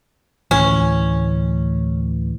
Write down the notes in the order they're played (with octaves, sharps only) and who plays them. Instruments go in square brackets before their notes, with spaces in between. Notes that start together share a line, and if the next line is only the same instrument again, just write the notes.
[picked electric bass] D2 A2 E3 [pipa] C#4